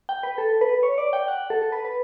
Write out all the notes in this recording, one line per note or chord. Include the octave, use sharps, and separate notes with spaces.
G5
B4
A4
B4
C#5
D5
G5
F#5
A4
A4
B4
B4